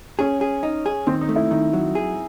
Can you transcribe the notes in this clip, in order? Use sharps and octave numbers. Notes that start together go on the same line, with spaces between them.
C#4 G#4
G#4
D#4
G#4
D#3 C4
D#4
A3
E4
D#3 D#4
F#3
G#4